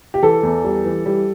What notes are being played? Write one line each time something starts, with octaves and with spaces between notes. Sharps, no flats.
G4
E3 A4
E2
G3
E3
G3